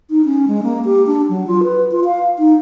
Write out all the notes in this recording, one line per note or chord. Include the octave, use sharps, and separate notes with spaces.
D#4
C#4
G#3
A#3
G4
D4
F#3
F4
B4
F4
F5
D#4